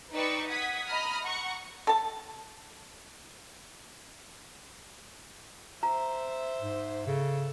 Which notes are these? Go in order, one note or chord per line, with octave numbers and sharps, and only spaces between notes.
D#4 B4 D5 G5 C#6 E6
F#5 D#6 G#6 B6
D#5 A#5 B5 D#6 F6
F#5 A#5 C#6
A4 A5
C5 E5 A#5
G#2
C#3 A4